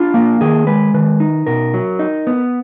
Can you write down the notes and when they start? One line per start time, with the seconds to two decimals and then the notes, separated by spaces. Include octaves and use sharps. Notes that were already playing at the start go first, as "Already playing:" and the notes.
Already playing: D4 F4
0.14 A#3
0.41 D#3 G#4
0.67 G#3 B4
0.94 D#3 B4
1.20 D#4
1.47 B2 A#4
1.74 F#3
1.99 D#4
2.27 B3